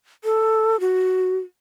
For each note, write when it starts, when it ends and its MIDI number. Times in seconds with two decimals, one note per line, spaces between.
0.24 0.80 69
0.80 1.37 66